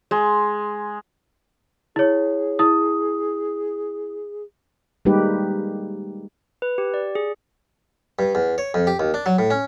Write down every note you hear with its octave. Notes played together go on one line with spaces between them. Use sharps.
G#3
E4 G#4 C#5
E4 D#6
G3 G#3 A#3 D#4 G4 B4
B4
G4
D5
G#4
G2
E2
C#5
F2
G4
D#2
D4
F#3
A2
C#4